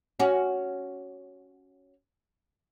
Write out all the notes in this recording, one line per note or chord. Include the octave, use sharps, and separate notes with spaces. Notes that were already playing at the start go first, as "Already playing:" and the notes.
C#4 F#4